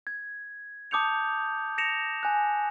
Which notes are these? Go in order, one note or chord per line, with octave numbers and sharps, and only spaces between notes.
G#6
A5 D6 D#6 G6 C#7 F7
A#6 C#7 E7 F7
G#5 F#6